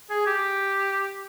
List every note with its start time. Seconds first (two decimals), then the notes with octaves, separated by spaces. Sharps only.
0.10 G#4
0.26 G4